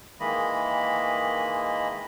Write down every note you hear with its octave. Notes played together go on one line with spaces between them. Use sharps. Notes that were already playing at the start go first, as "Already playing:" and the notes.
D#3 E3 G#3 A#3 D#5 B5